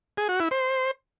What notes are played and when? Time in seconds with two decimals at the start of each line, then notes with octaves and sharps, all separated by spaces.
0.17 G#4
0.29 F#4
0.40 E4
0.51 C5